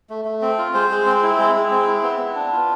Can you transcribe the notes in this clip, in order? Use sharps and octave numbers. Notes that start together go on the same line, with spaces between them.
A3
A3
C4
F4
G#3 C5
G#3
C4
E4
G#3
G#3
C4
E4
B3
B3
D4
F4